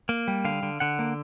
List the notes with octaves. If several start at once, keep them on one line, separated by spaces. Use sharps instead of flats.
A#3
G3
D3 F5
D3
D3 F#5
A#3